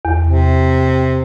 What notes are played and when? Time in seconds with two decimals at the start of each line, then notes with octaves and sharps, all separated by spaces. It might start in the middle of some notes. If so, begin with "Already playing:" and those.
0.05 E2
0.27 C3